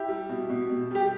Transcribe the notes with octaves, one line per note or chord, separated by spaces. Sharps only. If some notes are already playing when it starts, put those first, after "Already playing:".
Already playing: E4 G4
G3
B2
B2
B2
G3 G4